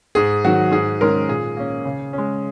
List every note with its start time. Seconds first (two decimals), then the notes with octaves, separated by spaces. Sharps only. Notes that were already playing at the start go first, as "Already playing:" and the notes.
0.15 G#2 G#4
0.44 D#3 F#3 F#4
0.72 G#2 G#4
1.01 D#3 G#3 C#4 A#4
1.29 A#2 G#4
1.57 A#3 C#4
1.85 C#3
2.13 G#3 C#4